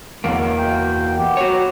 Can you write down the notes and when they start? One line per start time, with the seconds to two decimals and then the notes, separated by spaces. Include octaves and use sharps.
0.24 E2 F#3 A#3
0.58 B2 G5
1.19 B3 G4
1.37 F#4 C#5